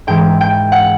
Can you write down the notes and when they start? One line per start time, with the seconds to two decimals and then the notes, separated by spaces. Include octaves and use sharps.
0.07 G#2 E3 G#3 G5
0.41 G5
0.72 F#5